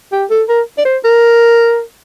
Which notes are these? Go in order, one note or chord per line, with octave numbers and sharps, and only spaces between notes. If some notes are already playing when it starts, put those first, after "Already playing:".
G4
A4
A#4
D5
C5
A#4